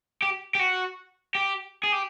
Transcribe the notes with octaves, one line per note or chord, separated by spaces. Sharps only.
G4
G4
F#4
G4
G#4
G4